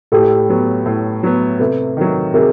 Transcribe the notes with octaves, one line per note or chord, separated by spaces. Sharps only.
A2 G4 A4
F#3 B3
A2
F#3 B3
C3 A4 B4
D#3 F#3
C3 G#4 A#4